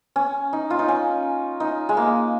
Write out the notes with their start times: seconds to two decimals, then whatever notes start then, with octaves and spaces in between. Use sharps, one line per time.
0.16 C#4
0.53 D#4
0.70 F4
0.79 D#4
0.88 C#4
1.60 D#4
1.89 G#3
1.97 A#3